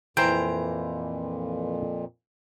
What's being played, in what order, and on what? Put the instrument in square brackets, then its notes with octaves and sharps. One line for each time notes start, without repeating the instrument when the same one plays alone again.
[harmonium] F2 A#2 [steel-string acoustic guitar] E3 A#5 [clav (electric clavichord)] C5 G5